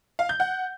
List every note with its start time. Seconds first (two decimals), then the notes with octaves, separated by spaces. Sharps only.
0.19 F5
0.29 G6
0.40 F#5